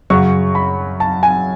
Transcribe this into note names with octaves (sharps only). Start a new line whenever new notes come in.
F#2 C#3 F#3 C#6
B5
A5
G#5